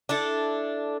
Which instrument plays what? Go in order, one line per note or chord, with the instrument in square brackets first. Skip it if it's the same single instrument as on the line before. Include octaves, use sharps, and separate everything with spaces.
[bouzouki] D4 E4 A4